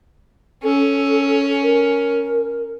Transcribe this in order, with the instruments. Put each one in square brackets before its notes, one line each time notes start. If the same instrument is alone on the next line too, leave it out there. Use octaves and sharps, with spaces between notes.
[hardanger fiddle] C#4 [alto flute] A4
[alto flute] A#4